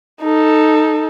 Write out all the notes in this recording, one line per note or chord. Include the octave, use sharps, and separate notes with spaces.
D#4 A4